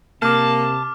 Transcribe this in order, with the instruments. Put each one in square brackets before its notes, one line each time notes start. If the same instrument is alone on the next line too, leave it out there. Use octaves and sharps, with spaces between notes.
[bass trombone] C3 [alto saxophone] A#3 [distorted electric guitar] A5 [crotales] D6 F6